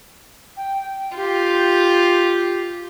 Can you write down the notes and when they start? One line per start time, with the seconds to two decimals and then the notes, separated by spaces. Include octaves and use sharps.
0.57 G5
1.16 F4 G4